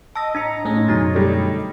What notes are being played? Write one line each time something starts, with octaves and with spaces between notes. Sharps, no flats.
D#5 A5 E6 A#6
A2 D4 D#5 A#5 E6 C#7
A2 C#4 G#4 C#5 D#5
G#2
F#2 B2 D3 D#4 F#4 A#5
G3 A3 D4